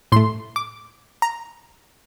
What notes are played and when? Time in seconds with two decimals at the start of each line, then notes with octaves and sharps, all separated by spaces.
0.12 A2 A3 C6
0.56 D6
1.22 A#5